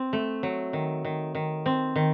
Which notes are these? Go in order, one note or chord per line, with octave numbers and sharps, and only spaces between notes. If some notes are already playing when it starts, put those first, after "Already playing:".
Already playing: C4
A3
F#3
D#3
D#3
D#3
C4
D#3